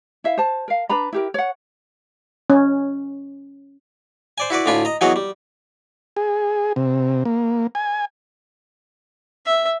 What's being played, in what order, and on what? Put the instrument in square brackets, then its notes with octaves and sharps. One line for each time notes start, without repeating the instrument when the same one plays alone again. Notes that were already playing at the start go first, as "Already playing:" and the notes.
[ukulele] E4 E5 F5
C5 A5
A#4 F5
D4 B4 A#5 B5
E4 G4 A#4
C#5 F#5
[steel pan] C#4
[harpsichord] C5 D5 G#5
E4 F#4 B4 D5
D2 A2 D4 F4 G#5 B5
D#5 A#5
E3 F#3 B3 F#4 G#4 D#5
G3
[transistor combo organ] G#4
C3
A#3
G#5
[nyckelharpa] E5